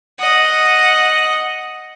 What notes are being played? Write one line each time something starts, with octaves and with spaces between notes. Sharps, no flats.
D#5 F#5